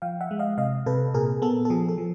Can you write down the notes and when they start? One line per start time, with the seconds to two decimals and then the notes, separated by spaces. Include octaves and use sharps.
0.02 F3 F5 G5
0.21 E5 F#5
0.31 G#3
0.39 D#5 F5
0.58 C3 D#5 F5
0.86 C3 A4 B4
1.14 A#2 G#4 A#4
1.42 B3 A4
1.65 A4
1.70 F3 G#4
1.89 A4
1.98 F3